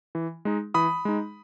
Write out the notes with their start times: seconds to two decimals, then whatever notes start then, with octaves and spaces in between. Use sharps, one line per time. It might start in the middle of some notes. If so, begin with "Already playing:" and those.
0.15 E3
0.45 G#3 D#4
0.74 E3 B5 D#6
1.05 G#3 D#4